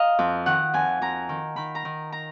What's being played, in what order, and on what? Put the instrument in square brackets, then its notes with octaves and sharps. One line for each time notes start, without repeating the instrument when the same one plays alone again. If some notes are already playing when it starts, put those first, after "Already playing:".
Already playing: [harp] D#5 F5 A#5
F2
D#3 F#5
F2 G#5
F2 A#5
D#3
D#3 B5
A#5
D#3
A#5